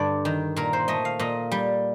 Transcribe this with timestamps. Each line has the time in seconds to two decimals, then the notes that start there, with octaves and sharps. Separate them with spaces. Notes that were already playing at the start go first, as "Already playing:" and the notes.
Already playing: G2 D3 D5
0.25 D#3
0.56 A#2 A#4
0.73 C5
0.88 A3 D#5
1.05 F5
1.19 A#2 D#5
1.52 G3